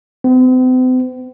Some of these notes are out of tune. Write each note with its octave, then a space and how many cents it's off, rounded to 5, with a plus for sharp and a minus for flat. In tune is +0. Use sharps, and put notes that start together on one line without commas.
C4 -45